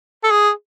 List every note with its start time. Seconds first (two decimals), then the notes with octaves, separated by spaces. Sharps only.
0.24 A4
0.31 G#4